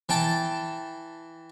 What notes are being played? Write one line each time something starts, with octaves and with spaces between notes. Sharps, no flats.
E3 G5 A5